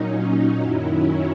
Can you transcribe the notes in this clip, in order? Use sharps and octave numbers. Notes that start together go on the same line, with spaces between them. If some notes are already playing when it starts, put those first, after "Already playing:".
Already playing: A#2 F#3 C#4 D#4
D#4
F#2 D#3 F#3 E4
C#4